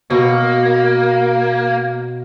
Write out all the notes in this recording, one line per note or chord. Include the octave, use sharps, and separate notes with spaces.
B2 A#3